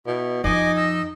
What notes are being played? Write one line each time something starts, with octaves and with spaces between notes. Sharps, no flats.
B2 E4
F2 F3 D#4 D#5 G#5 D6
D#5 E6